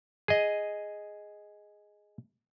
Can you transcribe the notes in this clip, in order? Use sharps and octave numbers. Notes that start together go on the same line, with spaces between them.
G#4 D#5